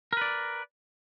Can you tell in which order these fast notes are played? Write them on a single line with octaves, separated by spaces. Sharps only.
A#4 B4 D5